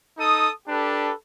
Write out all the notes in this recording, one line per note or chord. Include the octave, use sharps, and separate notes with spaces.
D#4 A4 D#6
D4 G4 A4 B4